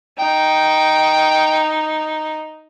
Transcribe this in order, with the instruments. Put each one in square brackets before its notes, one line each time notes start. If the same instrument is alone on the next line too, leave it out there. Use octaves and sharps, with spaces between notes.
[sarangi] D#4 [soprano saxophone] G5